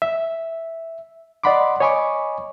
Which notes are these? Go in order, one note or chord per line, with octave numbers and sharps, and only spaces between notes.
E5
D5 D#5 F#5 B5 C6 D6
C#5 D#5 G#5 B5 C#6 D6